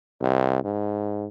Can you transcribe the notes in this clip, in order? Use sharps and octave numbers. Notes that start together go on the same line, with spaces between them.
C2
G#2